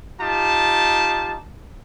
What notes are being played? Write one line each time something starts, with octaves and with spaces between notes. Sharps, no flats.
D#4 F4 G4 A5